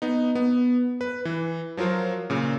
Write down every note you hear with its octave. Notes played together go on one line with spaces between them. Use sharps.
B3 D#4
B3
B4
E3
F3 F#3 F4 A#4 C5
A#2 C#3